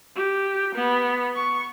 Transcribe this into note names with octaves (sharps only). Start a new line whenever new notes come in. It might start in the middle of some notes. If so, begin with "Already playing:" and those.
G4
B3
C#6